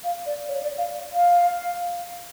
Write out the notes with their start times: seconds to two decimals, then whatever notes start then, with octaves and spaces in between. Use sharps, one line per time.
0.04 F5
0.26 D5
0.48 C#5
0.63 D5
0.78 F5
1.14 F5